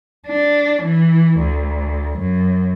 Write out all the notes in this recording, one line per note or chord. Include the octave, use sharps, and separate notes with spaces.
D4
E3
D2
F#2